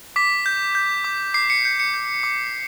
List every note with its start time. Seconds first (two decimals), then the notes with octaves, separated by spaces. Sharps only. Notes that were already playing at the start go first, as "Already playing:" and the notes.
0.16 D6 B6
0.46 G6
0.75 G6
1.04 D6
1.34 D6 C7
1.50 C#7
1.65 G6 C#7
1.79 C#7
1.94 G6
2.23 D6